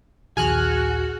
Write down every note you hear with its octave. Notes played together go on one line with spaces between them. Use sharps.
A#1 D#2 F#4 G#4 G#5 F6 F#6